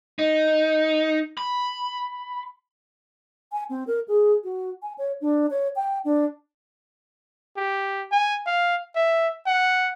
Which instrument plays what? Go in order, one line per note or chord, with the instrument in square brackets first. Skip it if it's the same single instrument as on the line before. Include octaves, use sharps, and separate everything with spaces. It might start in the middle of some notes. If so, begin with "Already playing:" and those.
[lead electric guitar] D#4
B5
[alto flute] G#5
C4
A#4
G#4
F#4
G#5
C#5
D4
C#5
G5
D4
[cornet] G4
G#5
F5
E5
F#5